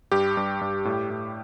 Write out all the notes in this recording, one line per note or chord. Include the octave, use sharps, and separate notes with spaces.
G2 G4
G2
G2
A2
A2